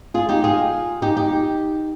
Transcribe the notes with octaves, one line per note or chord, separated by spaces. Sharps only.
F4 G#4
D#4 G4
F4 G#4
D#4 G4
D#4 G4